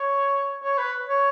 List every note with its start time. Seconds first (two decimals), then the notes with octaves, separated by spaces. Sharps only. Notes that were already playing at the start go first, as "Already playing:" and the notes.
Already playing: C#5
0.63 C#5
0.78 B4
1.09 C#5